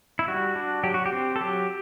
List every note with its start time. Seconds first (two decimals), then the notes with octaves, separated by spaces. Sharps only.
0.19 E4
0.28 G3 F#4
0.55 D4
0.83 F#3 G4
0.94 F#4
1.06 G4
1.13 C4
1.36 A4
1.41 F#3 G4